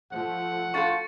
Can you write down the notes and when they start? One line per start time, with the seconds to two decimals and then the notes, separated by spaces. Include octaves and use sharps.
0.12 F3 A3 F#5
0.74 A2 F4 A4 C#6 A6 C#7